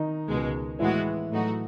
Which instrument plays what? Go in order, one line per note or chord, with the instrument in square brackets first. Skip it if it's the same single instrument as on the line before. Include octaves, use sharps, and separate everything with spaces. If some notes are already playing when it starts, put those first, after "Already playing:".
Already playing: [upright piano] D#3 D#4
[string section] C#2 B2 G#3
[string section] A2 G#3 B3 F#4 [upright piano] E3 E4
[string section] A2 F#3 A3 D#4 F#4